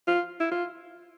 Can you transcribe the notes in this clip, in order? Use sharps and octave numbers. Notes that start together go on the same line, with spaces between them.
F4
E4
F4